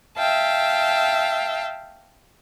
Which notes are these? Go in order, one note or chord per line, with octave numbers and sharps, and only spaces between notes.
E5 F5 G5 A5